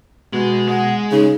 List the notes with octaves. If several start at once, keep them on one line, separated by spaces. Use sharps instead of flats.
B2 G#3
G#3 F#5
C#3 D#4